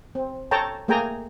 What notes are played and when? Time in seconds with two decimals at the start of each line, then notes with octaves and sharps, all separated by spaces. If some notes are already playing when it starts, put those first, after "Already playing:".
0.15 C4
0.51 A4 C#5 G5 A5 A#5
0.88 A3 A#3 G#4 G5 G#5 A#5